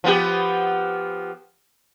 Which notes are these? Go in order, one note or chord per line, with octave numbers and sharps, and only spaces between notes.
F3 B3 G4